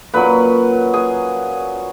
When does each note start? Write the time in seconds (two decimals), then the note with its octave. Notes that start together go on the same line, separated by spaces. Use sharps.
0.14 A#2 F#3 C#4 B4 B5
0.93 G#4 G#5